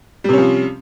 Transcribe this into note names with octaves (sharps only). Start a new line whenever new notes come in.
C3 F3 G3 C#4